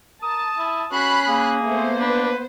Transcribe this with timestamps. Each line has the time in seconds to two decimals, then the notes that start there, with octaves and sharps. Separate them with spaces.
0.22 A#4 A5 D#6
0.58 E4
0.92 C#4 F#4 B5 F#6 C7
1.28 A#3 G#4
1.65 A3 B3 C5
2.00 D4 B4